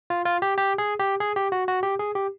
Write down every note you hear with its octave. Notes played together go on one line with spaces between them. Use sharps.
F4
F4
G4
G4
G#4
G4
G#4
G4
F#4
F#4
G4
G#4
G4